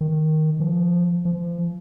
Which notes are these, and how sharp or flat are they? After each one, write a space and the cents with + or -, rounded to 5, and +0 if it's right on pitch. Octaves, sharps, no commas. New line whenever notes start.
D#3 +5
F3 +0
F3 -30